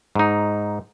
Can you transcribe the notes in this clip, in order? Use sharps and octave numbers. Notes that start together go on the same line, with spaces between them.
G#2 D#4